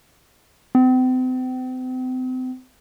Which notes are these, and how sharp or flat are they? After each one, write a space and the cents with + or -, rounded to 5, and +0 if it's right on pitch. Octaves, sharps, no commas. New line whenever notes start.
C4 -40